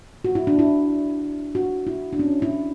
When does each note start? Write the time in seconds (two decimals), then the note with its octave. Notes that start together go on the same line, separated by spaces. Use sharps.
0.25 F#4
0.35 E4
0.47 D4
0.59 E4
1.55 F#4
1.87 E4
2.13 D4
2.19 C#4
2.42 E4